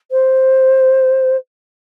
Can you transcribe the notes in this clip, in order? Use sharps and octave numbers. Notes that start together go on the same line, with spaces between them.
C5